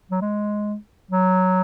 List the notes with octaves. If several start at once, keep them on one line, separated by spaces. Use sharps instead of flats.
F#3
G#3
F#3